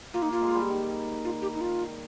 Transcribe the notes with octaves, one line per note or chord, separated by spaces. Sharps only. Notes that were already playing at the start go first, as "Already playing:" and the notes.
A#3 F4
D#4
A#3 F4
G#3
G3
D#3
F4
G4
D#4
F4